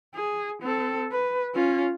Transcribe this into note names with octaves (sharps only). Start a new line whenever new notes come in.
G#4
C4 A4
B4
C#4 F4